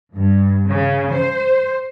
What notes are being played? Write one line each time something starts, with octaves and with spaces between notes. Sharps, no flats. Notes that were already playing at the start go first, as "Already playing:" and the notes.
G2
C#3
C5